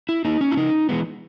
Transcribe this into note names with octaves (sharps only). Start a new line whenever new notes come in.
E4
A#3 D#4
C#4
E4
C#3 D#4
E3 G#3 B3